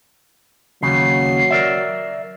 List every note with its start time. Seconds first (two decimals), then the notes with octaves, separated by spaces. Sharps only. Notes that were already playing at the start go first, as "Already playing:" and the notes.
0.83 D#2 C#3 F#3 C7
1.51 A#4 D5 E5